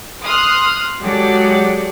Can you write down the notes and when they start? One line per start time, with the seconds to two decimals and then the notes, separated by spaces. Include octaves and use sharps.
0.24 C6 D#6 F6 F#6
1.01 F#3 G#3 G4 A4 D5 F#5